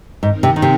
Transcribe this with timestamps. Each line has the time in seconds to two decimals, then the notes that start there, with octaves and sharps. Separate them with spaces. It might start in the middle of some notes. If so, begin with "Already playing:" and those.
0.23 G#2 D#3 C4 D#4 A#4
0.43 C3
0.56 D#3
0.62 C3